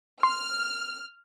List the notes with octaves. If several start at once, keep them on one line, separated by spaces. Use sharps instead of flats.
C6 F6